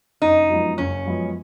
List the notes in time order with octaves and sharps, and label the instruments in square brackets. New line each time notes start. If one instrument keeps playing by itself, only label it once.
[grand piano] F#1 [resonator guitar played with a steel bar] D#4
[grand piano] F#2 F3 G#3 B3
[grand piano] F#1 [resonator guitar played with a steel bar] C#4
[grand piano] F#2 F3 G#3 B3